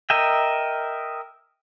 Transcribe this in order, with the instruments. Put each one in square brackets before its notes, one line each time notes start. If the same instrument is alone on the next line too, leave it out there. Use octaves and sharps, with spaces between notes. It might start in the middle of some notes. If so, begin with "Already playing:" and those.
[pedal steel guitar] A#4 D#5 E5 G5